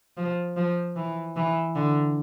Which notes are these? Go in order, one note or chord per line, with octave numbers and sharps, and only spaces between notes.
F3
F3
E3
E3
D3